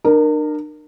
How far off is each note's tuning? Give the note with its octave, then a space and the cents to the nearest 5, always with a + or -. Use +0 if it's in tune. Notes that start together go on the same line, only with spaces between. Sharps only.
D4 +45 A#4 +0